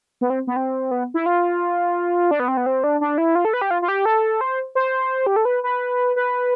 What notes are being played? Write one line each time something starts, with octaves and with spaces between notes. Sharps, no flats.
B3
C4
B3
C4
B3
E4
F4
D4
B3
C4
B3
C4
D4
D4
E4
F4
A4
B4
G4
F4
F4
G4
A4
C5
C5
G4
A4
B4
B4
B4